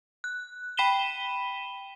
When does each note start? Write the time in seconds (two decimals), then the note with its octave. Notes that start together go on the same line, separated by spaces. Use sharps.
0.24 F#6
0.77 G5 B5 B6 D#7 E7 G7